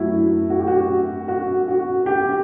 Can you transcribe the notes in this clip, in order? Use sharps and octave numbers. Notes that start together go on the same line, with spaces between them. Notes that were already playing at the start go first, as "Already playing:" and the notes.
Already playing: F#2 F#3 A3 E4 F#4
F#4
G4
F#4
F#4
F#4
G4